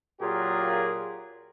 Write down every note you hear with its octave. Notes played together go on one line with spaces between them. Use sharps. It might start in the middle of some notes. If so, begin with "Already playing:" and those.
A#2 F#3 F4 G4 G#4 A#4